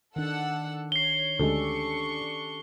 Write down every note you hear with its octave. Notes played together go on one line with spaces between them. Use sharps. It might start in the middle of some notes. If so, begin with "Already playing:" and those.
D#3 D4 A4 F#5 E6
C#5 C7 G7
D2 G#3 C#4 D4 G4 A4 C#6